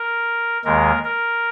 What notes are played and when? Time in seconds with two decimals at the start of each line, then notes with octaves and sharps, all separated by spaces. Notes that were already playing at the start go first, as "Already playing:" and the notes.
Already playing: A#4
0.65 D#2 D#3 G#3 A#4
1.04 A#4